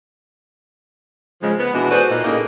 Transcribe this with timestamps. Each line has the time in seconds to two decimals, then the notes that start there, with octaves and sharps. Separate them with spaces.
1.43 C#3 F3 G#3
1.59 B3
1.74 B2 E3 G#3 D4 F#4
1.91 F#4 G#4 A4 B4 C5 D5
2.10 A#2 D#4 F4
2.24 A2 C#3 A#3 D#4